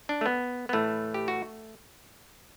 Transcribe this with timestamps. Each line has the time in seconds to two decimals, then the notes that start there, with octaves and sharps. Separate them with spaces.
0.09 D4
0.21 A3
0.26 B3
0.69 B3
0.73 A2 E3 A3
1.14 G4
1.28 F#4